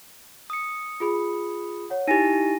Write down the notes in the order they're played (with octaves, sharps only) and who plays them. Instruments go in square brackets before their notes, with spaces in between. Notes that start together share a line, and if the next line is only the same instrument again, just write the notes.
[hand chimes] D#6 C#7
[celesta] F4 G#4 B5
C#5 F#5
[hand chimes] D#4 E4 G4 [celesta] G#5 A#6 D#7